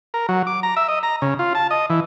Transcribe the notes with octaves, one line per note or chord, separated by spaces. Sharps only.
A#4
F#3
D6
A#5
E5
D#5
A#5
C#3
F4
A5
D#5
E3